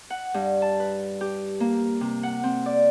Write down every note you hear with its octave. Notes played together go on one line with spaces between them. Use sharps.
F#5
G2
A5
B4
G4
A#3
C3
F#5
C4
D5